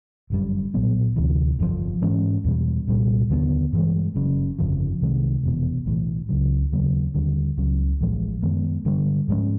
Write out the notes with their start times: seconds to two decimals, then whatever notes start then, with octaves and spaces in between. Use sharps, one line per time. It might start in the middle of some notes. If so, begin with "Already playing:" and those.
0.30 G1 F#2 D3 G3
0.74 B1 A#2 F#3 B3
1.16 D2 C3 E3
1.59 G1 F2 D3 F3
2.01 G#2 E3 G#3 C#4
2.44 E2 B2 G3
2.87 C2 A#2 G3
3.30 D#2 D3 G3 B3
3.73 G2 E3 G#3
4.15 F#1 F#2 C#3
4.59 G1 F2 C#3 F3
5.01 C2 C3 D#3 G#3
5.43 F1 E2 B2
5.86 B1 A2 E3
6.29 C#2 C#3 F#3
6.72 D#2 C#3 F#3 A#3
7.14 D#2 D3 G3
7.57 C#2 C#3 F#3
8.01 A1 A2 F3 G#3
8.42 F#2 D#3 G#3 B3
8.85 G2 D3 G3
9.28 G#2 F3 G#3 C#4